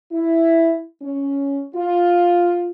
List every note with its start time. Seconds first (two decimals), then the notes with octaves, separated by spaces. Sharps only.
0.12 E4
1.02 C#4
1.75 F4